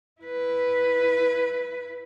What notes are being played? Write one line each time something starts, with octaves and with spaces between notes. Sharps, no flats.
E4 B4